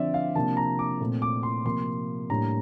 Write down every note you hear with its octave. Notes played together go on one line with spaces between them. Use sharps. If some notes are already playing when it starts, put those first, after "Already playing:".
Already playing: D3 F3 C4 D5 E5
F5
C3 F3 A#3 D4 A5
A#5
D6
A#2 A3 C4
D6
C6
C3 F3 A#3 C6
A2 G3 A#3 D4 A#5